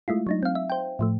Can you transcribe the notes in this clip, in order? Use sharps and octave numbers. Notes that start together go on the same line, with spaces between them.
G#3 A3 E4 F4
F#3 D4 D#4
C4 F5
E5
C5 G5
A2 F3 A3